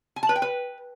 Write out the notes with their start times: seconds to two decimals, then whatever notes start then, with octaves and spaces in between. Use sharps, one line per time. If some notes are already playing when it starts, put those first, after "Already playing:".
0.16 G#5
0.23 A5
0.29 B4
0.36 G5
0.42 B4